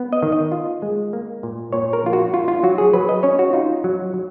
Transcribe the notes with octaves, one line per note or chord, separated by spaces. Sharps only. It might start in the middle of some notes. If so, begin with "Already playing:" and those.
Already playing: B3
D#5
D#3
D#5
F4
G#3
A#3
A#2
A#2 C#5
A#4
F3 F4
F#4
F4
F4
F#3 F#4
G#4
F#3 B4
D#5
C#4 C#5
F#4
D#4 F4
F#3
F#3